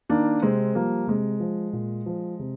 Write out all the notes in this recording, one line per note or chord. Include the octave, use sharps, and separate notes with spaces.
D#3 A#3 D4
C3 G#3 C4
F3 G3 A#3
C3 G#3
F3
A#2
F3
C3